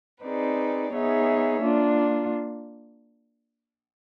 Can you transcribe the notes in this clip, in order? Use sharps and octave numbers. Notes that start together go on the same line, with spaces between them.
C4 D#4 G#4 B4 D5
B3 D#4 G#4 C#5 E5
A#3 D4 F4